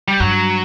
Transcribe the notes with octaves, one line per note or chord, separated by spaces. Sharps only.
G3
G2 F#3